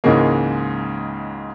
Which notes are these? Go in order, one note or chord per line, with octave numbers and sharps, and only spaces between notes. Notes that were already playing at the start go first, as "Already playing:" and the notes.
C#2 G#2 C#3 E3 G#3 A#3